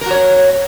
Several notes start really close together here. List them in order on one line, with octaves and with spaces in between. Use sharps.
A#4 F#4 C#5